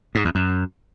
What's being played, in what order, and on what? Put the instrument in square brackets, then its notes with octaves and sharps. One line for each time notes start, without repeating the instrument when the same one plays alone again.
[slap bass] G#2
E2
F#2